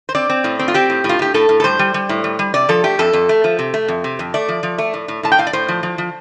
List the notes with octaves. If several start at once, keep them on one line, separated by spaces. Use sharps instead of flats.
C5
C4 D5
C4
A2
C4
F4
C4 G4
A2
A2
F4
A2 G4
A2 A4
A2
A4
G3 C5
G3
G3
A2
G3
G3
C3 D5
F3 A4
A3 G4
F2 A4
F2
A3
F3
C3
A3
F2
C3
F2
A3 D5
F3
F3
A3
A2
A2
A2 A5
G5
A2 F5
D5
A2 C5
F3
F3
F3